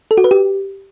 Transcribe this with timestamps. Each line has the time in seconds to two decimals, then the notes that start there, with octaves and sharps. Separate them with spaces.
0.11 A4
0.17 F#4
0.24 B4
0.31 G4